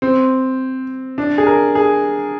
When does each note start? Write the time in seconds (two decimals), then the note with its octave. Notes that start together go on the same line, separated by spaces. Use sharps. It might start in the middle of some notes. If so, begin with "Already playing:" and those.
0.02 C4
1.18 D4
1.38 G#4
1.47 A#4
1.75 G#4